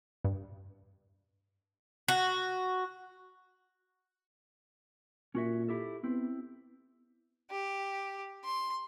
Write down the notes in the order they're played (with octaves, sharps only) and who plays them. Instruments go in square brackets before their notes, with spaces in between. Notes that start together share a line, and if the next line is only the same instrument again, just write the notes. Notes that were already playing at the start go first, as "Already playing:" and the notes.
[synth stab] G2
[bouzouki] F#4
[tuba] A#2 [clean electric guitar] C#4 F#4 E5
[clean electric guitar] E4 G4 A4
[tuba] B3 [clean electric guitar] C4 E4
[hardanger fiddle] G4
C6